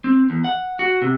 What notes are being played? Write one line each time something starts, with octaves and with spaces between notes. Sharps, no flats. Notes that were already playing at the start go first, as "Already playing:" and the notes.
C4
E2
F#5
F#4
C3